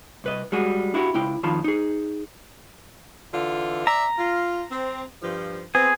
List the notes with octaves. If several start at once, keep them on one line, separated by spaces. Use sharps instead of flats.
C2 B4 D#5
G3 G#3 F#4 G#4
D4 E4 F#4 G4
C#2 E4 G5
F2 D#3 F4 A5 B5
D#4 G#4
D3 E3 F4
D5 E5 A#5
F4
C4
G2 F3
B3 C4 G#4